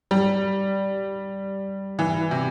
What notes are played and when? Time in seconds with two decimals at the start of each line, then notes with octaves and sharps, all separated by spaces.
0.11 G3
1.99 E3
2.31 C3